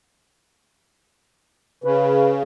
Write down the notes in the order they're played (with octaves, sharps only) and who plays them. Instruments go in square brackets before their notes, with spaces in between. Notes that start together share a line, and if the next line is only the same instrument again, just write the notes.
[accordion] C#3 [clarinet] B4